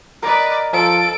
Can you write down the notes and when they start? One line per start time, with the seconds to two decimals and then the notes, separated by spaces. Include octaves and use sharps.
0.22 A#4 B4 D5 D#5
0.73 F3 A4 D7